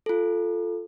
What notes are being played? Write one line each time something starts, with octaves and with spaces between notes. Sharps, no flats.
F4 A4